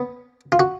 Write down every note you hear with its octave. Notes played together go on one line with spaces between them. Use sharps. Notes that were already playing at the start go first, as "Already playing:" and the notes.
Already playing: B3
F4
F#4